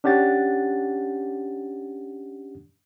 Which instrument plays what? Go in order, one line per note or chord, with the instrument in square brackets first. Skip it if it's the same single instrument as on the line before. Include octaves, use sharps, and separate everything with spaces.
[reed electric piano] C#4 D4 G4 F#5 A6